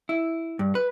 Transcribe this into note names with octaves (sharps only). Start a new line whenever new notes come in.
E4
G2
B4